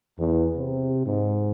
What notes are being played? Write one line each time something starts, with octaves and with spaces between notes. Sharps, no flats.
E2
C3
G#2